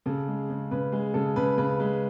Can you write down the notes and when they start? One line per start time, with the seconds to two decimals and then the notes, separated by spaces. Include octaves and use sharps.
0.06 C#3 A4
0.28 G#3
0.50 C#3
0.71 C#3 B4
0.92 G#3 G#4
1.14 C#3 A4
1.36 C#3 B4
1.58 C#3 B4
1.80 G#3 B4